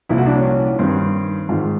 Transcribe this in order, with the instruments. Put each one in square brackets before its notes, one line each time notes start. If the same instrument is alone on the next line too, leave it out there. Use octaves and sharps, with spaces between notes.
[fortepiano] C2 A#2 F3 E4
F#4
D4
C#4
G2 D#3 C4
G#2 D#3 F4